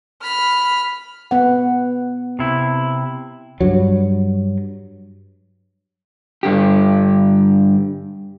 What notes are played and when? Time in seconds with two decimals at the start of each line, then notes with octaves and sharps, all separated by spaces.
0.22 B5 F6
1.31 B3 F#5
2.39 C3 E4
3.61 G2 F#3
6.43 G2 D3 G4